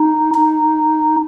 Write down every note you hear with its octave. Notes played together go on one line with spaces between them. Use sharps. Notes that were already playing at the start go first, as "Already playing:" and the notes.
Already playing: D#4
D#4